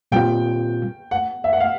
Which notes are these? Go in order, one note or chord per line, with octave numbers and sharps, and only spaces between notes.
A#2 G3 C4 F4 G5
F#5
E5
F#5
F5